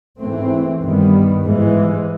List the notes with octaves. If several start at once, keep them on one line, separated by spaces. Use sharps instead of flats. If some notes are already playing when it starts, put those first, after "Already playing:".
G#2 E3 A3 C4
G2 D#3 G3 B3
G#2 E3 G#3